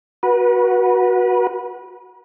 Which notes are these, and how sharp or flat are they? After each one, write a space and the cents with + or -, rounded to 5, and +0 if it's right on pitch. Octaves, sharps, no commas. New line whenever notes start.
F#4 -5 B4 -30